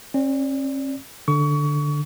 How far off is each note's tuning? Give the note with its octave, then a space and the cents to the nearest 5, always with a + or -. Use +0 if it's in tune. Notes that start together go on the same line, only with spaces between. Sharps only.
C#4 -45 D5 -5
D3 +5 C#6 +30